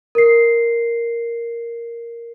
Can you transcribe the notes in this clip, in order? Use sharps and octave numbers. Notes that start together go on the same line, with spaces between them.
A#4 C7